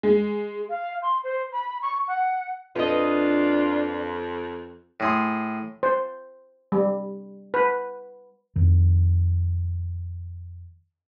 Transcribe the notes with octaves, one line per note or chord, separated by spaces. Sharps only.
G#3
F5
C6
C5
B5
C#6
F#5
F2 D4 F4 B4 D#5
A2 G#4 C6
C5
G3
B4
F2 D#3